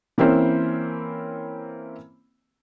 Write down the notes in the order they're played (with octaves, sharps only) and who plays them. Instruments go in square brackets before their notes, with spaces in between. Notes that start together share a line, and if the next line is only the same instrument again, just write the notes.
[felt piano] E3 A#3 C4 C#4 E4 C5